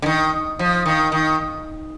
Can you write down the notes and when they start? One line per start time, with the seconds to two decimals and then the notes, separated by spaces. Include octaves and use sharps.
0.02 D3
0.06 D#3
0.59 F3
0.86 D#3
1.12 D#3